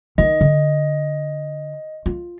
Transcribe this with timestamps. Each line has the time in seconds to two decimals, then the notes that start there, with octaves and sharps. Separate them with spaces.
0.18 D#3 D#4 D#5
0.41 D3
2.06 F4